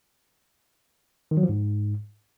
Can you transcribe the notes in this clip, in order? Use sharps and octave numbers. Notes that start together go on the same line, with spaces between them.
D#3
F#3
F3
G#2